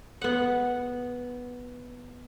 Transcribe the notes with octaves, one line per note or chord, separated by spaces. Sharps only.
B3 F#5